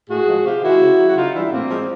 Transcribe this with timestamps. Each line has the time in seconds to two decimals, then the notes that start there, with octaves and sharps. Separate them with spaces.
0.09 A2 F#4 G#4
0.27 F3 G#3
0.45 C3 F4 G4
0.63 D#3 G#3 E4 F#4
0.81 C#3
0.99 F#3
1.08 F#4
1.16 C#3 D#4 F4
1.34 E3 G3 D4 E4
1.52 A2 A#3 C4
1.70 F3 G#3